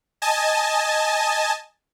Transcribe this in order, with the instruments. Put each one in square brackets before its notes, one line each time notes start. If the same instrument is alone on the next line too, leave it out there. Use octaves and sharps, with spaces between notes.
[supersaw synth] D#5 G#5 A5